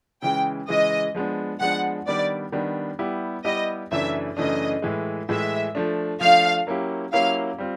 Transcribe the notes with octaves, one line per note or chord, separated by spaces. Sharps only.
C#3 E3 G#3 G5
C#3 E3 G#3 D#5
F3 G#3 B3 D4
F3 G#3 B3 D4 F#5
D#3 G3 B3 D4 D5
D#3 G3 B3 D4
G3 B3 E4 G4
G3 B3 E4 G4 D#5
F#2 C#3 E3 A3 D4 E5
F#2 C#3 E3 A3 D4 D#5
A2 E3 G#3
A2 E3 G#3 E5
F3 A3 D4
F3 A3 D4 F5
F#3 A#3 C#4 E4 G4
F#3 A#3 C#4 E4 G4 F5
G3 C4 F4